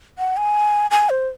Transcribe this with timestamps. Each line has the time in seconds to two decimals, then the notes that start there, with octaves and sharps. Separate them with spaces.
0.18 F#5
0.37 G#5
0.91 G#5
1.10 C5